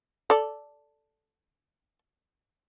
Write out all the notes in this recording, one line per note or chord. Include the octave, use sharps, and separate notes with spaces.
A4 D5